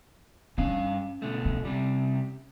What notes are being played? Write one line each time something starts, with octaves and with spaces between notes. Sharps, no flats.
G2 C#4 D4 F5
B2 D3 A3
C#4
C3 G3